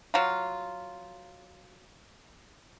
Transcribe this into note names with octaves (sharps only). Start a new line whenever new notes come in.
F#3 F4